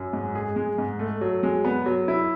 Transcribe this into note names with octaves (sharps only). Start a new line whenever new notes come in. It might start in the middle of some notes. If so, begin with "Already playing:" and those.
Already playing: F#2
G#2
G#4
G#3
G#2
A3
F#3
G#3
B3
F#3
E4